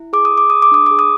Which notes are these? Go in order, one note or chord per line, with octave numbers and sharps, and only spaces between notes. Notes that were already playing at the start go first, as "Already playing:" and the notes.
Already playing: E4
G#4 D6
D#6
G#4
D6
G#4 D#6
D6
D4 D#6
G#4 D6
D#6